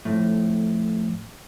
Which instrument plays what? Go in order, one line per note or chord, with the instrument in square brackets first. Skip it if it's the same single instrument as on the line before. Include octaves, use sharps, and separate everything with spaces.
[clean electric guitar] F2 A2